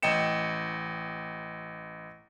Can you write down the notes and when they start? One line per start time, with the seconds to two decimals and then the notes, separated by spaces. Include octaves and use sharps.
0.03 A1 D#5 G5 C#7 E7